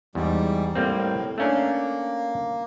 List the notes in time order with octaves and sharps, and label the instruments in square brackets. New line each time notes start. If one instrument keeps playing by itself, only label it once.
[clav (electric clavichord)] E2 [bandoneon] G#2 G3
[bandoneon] A2 [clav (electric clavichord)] G3 A#3 C4
[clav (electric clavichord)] A3 C#4 D4 [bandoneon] A#3